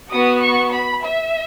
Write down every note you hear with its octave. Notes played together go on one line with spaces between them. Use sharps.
B3 F#4 D#6
C#6
B5
E5